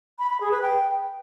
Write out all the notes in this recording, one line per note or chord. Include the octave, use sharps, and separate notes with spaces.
B5
B5
G#4
B4
G5